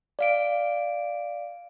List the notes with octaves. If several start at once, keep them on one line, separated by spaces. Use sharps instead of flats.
D5 F5 D7